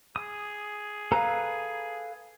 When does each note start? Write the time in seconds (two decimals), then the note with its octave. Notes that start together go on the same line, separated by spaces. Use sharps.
0.16 G#4 D#6
1.12 A4 B4 F5 A#5